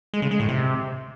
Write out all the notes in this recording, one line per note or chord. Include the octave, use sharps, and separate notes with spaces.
G#3
C#3
G#3
A2
C3